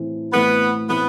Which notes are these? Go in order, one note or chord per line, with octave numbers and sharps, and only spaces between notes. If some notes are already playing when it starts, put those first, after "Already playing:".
Already playing: A2 E3 A3 C4
A2 E3 A3 B3 C4
A2 E3 A3 B3 C4